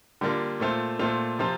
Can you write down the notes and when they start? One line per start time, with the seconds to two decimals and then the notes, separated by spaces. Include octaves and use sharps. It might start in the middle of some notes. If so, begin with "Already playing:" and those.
0.21 D3 G3 A#3 D4 F4
0.60 A#2 A3 C4 F4
0.99 A#2 A3 C4 F4
1.39 C3 F3 C4 F4